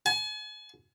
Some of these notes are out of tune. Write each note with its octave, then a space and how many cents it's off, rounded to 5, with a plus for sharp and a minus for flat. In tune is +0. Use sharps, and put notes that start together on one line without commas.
G#5 +40